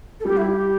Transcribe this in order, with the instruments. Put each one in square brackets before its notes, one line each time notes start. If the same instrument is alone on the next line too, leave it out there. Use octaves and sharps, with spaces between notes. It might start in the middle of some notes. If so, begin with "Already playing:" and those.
[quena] A4
[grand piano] G3 [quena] G4
[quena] E4
G4